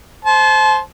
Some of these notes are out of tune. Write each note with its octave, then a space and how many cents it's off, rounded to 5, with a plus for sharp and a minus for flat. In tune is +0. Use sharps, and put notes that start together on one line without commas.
C5 +0 A5 -35